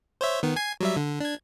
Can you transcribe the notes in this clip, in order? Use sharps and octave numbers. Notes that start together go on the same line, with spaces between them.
C5 C#5 E5
D#3 B3
G#5 G#6 C7
F#3 G3 E5
D3
D4 G#6